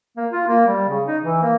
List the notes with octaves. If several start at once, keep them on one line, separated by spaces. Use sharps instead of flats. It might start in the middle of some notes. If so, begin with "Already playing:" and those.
A#3
F4
A#3
G3
C#3
D#4
E3
A#3